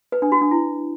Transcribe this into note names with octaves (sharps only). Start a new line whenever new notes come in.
B4
D4
F#4
D4
E4